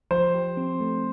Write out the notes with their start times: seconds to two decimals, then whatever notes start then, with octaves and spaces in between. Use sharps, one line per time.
0.11 F3 C5
0.34 G4
0.57 C4
0.80 A3